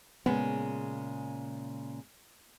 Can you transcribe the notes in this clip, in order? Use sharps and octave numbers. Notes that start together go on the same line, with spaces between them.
A#2 C#3 G#3 B3